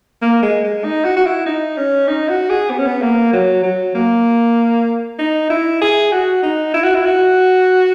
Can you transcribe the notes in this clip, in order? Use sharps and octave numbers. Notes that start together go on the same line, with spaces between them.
A#3
G#3
G#3
D#4
F#4
F#4
E4
D#4
C#4
D#4
F#4
G#4
B3
C#4
B3
A#3
F#3
F#3
A#3
D#4
E4
G#4
F#4
D#4
E4
F#4
E4
F#4